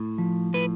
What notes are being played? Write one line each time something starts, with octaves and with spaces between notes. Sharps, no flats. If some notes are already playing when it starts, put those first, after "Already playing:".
Already playing: A2
F3
A2 B4